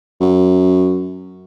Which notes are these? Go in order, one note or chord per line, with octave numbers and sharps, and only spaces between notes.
F#2